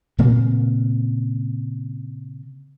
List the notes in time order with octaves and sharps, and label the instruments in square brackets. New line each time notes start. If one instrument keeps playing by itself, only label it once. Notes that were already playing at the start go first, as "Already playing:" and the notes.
[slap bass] A#2 C#3 A#3 C4